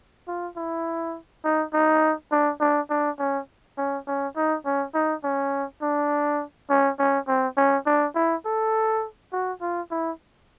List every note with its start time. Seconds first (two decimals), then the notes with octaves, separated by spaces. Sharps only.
0.28 F4
0.56 E4
1.44 D#4
1.73 D#4
2.31 D4
2.60 D4
2.90 D4
3.19 C#4
3.78 C#4
4.07 C#4
4.36 D#4
4.65 C#4
4.94 D#4
5.24 C#4
5.82 D4
6.70 C#4
6.99 C#4
7.27 C4
7.57 C#4
7.86 D4
8.15 E4
8.45 A4
9.32 F#4
9.61 F4
9.91 E4